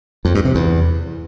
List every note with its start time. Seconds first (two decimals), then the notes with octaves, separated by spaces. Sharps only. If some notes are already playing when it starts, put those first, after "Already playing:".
0.25 F2
0.35 G2
0.45 C3
0.55 E2